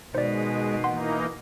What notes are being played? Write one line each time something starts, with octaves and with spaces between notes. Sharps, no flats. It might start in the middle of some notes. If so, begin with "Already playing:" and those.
B2 D#3 G#3 C5 D5
E3 A#3 D#4 F#5 C6